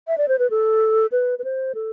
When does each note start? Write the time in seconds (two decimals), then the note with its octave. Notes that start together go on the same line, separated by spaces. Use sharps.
0.08 E5
0.18 D5
0.28 C5
0.39 B4
0.50 A4
1.12 B4
1.39 B4
1.44 C5
1.75 A4